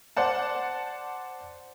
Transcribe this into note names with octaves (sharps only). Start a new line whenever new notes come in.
C5 D5 F#5 A5